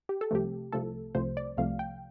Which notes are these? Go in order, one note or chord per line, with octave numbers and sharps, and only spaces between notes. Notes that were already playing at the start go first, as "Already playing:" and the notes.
G4
A4
C2 C3 F3 A3 G4
C2 C3 F3 A3 A4
C2 C3 F3 A3 C5
D5
C2 C3 F3 A3 F5
G5